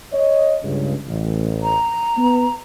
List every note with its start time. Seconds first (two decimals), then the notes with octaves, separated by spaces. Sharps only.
0.13 C#5 D#5
0.64 C#2 G2 C#3
1.08 A1
1.63 A#5
2.18 B3